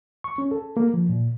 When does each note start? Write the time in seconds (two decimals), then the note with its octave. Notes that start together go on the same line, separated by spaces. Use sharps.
0.24 C#6
0.38 C#4
0.51 A4
0.77 A#3
0.94 F3
1.09 A#2